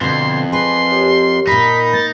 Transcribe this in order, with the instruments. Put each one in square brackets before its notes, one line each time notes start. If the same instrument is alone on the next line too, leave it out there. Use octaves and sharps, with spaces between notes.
[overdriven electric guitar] F2 [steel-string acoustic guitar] B2 D3 [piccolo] C6
[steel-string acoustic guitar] G#4 B4 [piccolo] C6
[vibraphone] G4 A#4 C#5
[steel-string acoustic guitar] A#2 A#4 [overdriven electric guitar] D#4 [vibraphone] B5 [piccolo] B6
[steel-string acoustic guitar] A#3 [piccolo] A6